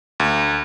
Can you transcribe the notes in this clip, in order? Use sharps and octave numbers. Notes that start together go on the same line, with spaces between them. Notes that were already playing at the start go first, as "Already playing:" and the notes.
D2